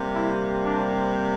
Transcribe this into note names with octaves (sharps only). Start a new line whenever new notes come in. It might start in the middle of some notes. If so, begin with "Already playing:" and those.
Already playing: C3 G3 A#3
E4
D4